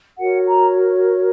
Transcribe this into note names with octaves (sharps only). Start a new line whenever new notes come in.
F#4 A#4 C#5 F#5
A#5